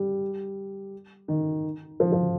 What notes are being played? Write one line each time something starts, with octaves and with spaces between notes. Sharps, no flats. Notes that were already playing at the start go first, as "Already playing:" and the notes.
Already playing: G3
D#3
F3
F3